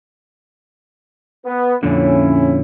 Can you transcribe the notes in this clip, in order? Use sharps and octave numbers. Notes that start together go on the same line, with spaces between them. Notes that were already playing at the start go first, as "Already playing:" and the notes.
B3
F2 A#2 D3 C#4 E4